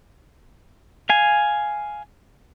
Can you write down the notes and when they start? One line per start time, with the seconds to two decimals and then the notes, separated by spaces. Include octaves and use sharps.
1.09 F5 G#5